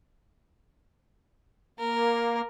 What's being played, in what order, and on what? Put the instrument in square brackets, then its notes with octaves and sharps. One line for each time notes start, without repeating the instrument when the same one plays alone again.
[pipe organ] A#3 [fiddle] A#4